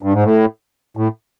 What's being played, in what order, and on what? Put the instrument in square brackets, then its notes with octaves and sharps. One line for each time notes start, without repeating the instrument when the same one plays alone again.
[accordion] G2
G#2
A2
A2